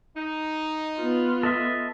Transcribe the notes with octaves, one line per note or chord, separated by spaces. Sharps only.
D#4
B3 F4
A4 D#5 E5